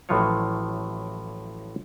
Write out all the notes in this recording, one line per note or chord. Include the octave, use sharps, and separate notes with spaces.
A1 A2 F3 F#3 F4 C#5